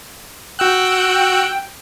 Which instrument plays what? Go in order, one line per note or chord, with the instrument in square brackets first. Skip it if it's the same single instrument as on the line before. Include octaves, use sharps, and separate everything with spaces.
[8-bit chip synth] F#4 E6 F#6 [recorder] G5